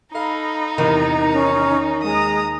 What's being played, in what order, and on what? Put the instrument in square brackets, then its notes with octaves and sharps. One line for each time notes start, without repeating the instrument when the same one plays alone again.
[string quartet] D#4 A#5 [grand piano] A4 F5 [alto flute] B5
[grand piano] E2 C3 [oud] D#3
[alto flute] C#4
[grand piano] D#2 [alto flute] G#3 [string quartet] A#5 D#6